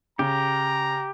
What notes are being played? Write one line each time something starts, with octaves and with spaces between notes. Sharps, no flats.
C#3 G4 A#5